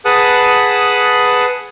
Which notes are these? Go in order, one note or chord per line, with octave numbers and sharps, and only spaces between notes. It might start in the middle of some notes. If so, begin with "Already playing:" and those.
G#4 B4 F#5 A5 D#6 F#6